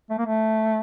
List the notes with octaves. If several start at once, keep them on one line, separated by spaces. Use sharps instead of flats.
A3
A#3
A3